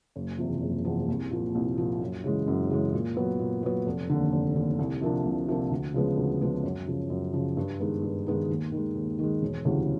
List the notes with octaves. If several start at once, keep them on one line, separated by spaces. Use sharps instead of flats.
F#1
E2 C3 F3
F#1
E2 C3 F3
C2
A#2 F3
C2
A#2 F3
F#2
C#3 E3 G#3
F#2
C#3 E3 G#3
A#2
F#3 B3
A#2
F#3 B3
F1
D#2 D3
F1
D#2 D3
C2
C3 F3 A#3 D4
C2
C3 F3 A#3 D4
D2
C#3 F3 G#3 B3
D2
C#3 F3 G#3 B3
F#2
C#3 F3
F#2
C#3 F3
G2
D#3 G#3 B3 D#4
G2
D#3 G#3 B3 D#4
D#2
D#3 G#3
D#2
D#3 G#3
E1
D2 C#3 E3 G3